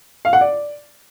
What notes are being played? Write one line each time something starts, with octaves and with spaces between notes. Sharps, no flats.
F5
F#5
D5